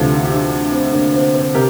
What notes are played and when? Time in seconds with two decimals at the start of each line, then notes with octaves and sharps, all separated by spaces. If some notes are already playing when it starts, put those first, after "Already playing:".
Already playing: D2 C3 E3 F4 A4
0.16 F4
0.25 G4
0.34 D4 F4
0.71 C4 E4
0.92 A#3 D4
1.13 C4
1.34 C4
1.54 C3 G4 A#4